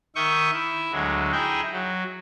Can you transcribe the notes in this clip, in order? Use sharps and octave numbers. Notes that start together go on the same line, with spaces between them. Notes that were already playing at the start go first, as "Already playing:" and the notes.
D#3 E5 C#6 D#6 G6
E4 E5
D2 F#3 G#3
D#4 E4 G#4 D#5 G5
F#3